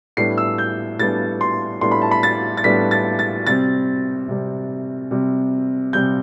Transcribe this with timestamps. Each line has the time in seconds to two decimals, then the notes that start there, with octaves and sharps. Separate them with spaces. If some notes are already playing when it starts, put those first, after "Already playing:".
0.17 A2 G3 B3 D4 C7
0.38 E6
0.58 G6
0.99 A2 G3 B3 D4 A6
1.41 C6
1.81 A2 G3 B3 D4 C6
1.92 B5
2.02 A5
2.11 B5
2.23 A6
2.57 A6
2.64 A2 G3 B3 D4 B6
2.91 A6
3.19 A6
3.46 C3 G3 C4 A6
4.28 C3 G3 C4
5.11 C3 G3 C4
5.93 C3 G3 C4 G6